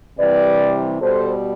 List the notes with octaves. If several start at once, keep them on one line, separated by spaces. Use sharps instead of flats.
C3 E3 G3 B4 D5
B2 G3 A4 C5